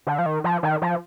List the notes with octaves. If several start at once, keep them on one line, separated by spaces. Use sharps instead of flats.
D3
F3
D#3
F3
D#3
F3